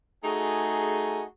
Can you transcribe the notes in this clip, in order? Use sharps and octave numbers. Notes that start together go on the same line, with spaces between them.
A3 D#4 F#4 G#4